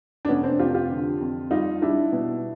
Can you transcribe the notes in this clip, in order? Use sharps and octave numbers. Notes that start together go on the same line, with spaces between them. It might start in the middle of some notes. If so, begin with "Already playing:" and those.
D4
F1 B3 C#4
C4 D4
F2 F4 G4
F4 G4
D3
F2
G3 D#4 F4
G3 D4 E4
B2